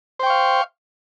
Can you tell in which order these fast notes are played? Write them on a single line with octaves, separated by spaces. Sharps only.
C5 G5 C#6 F5